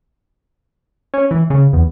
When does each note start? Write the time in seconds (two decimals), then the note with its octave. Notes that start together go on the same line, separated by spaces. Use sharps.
1.14 C#4
1.31 E3
1.50 C#3
1.73 E2